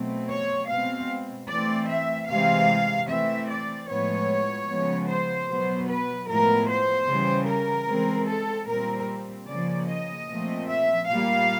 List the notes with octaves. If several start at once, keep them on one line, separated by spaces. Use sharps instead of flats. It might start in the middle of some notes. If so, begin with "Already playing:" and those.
Already playing: B2 F#3 A3 C4
C#5
B2 G#3 C4 F5
E3 A3 C4 D5
E5
C3 E3 G#3 C4 F5
E3 A3 C4 E5
D5
A2 F3 G#3 B3 C#5
C#3 F3 G#3 B3
C5
B2 F#3 B3
B4
A2 F3 G#3 B3 A#4
C5
C#3 E3 G3
A#4
E3 G#3 C4
A4
A#2 G3 C4 A#4
C#3 F3 A#3 D5
D#5
A#2 F3 A3 C4
E5
A#2 G3 A#3 F5